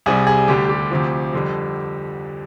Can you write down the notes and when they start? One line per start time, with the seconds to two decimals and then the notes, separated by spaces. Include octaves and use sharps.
0.06 C2 C3 G3 G#4
0.27 G#4
0.48 D2 D3 G3 G4
0.69 G4
0.91 D2 C3 F3
1.33 F2 D3 G3